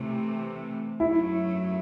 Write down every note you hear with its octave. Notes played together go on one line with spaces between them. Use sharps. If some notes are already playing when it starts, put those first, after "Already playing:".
Already playing: C3 E3 A3
F#2 F#3 A3 E4